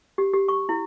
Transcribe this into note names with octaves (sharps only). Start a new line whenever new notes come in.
G4
G4
C#6
E4